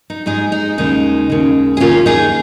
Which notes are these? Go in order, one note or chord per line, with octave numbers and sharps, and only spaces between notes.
D#4
G#2 G#3 D#4 G#4
D#4 G#4
D#2 C#3 G#3 D#4
D#2 C#3 G#3
G#4
D#2 D#3 A#3 C#4 F4
D#4 G#4